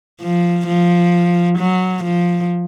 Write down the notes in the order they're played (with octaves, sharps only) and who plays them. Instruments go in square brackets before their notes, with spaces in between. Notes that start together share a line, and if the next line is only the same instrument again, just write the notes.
[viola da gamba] F3
F3
F#3
F3